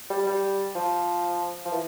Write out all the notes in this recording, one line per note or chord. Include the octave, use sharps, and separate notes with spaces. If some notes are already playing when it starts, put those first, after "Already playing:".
G3
G3
F3
F3
E3